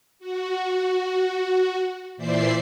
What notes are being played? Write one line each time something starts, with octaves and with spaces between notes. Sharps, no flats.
F#4
A#2 E3 C5 D5 E5 C7